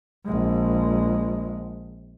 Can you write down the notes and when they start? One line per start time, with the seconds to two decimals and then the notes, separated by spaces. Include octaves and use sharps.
0.25 A#1 G#3